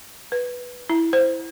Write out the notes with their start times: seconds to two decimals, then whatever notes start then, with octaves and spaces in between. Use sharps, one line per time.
0.32 B4
0.89 E4
1.13 C5